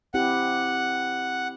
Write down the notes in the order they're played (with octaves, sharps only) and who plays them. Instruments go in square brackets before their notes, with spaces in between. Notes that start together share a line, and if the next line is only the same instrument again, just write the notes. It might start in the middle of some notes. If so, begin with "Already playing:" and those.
[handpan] C4 E4 G4 [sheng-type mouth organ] F#5